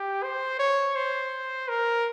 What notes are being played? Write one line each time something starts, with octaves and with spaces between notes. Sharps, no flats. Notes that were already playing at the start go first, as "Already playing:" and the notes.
Already playing: G4
C5
C#5
C5
A#4